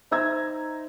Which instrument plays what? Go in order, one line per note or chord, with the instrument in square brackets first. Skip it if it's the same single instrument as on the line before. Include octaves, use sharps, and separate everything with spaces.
[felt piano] D#4 C5 E5 A#5 E6 G#6